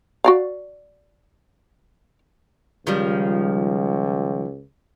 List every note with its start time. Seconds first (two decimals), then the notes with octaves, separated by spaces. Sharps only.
0.24 F#4 D5 F5
2.87 C#2 D#3 F3 G3